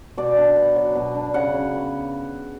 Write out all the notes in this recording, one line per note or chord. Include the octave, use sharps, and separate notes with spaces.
B2 D5
D4
B3
F#3
B2
D4
C#3 F#5
C#3
B3